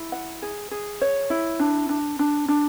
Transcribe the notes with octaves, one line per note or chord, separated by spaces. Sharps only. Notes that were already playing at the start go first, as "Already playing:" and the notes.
Already playing: E4
F#5
G#4
G#4
C#5
E4
D4
D4
D4
D4